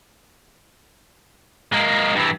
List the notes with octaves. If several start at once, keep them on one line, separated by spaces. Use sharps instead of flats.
G#3 A#3
G2 E3